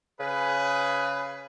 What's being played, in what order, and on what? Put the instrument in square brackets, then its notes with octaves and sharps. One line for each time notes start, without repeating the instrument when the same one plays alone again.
[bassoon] C#3 [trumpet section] G#4 B4